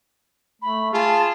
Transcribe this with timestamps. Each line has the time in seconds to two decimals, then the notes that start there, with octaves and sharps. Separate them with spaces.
0.62 A3 B5
0.94 F4 G#4 A5